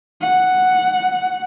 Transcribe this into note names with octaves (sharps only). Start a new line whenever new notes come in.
F#5